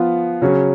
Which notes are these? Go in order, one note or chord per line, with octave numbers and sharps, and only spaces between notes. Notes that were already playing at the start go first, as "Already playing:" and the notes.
Already playing: F3 B3 F4
C#3 F#3 C#4